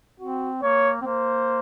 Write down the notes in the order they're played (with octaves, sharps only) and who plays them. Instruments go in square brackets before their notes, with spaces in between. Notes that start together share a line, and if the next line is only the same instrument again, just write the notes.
[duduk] C4 [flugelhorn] F#4
[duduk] A#3 [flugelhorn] C#5
[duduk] C4
[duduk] A#3 [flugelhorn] C5